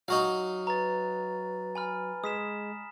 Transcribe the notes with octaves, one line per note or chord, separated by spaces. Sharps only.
F#3 D#4 F#4 F5
B4 A#5 A6
G#5 B5 F6
G#3 D#6 B6 E7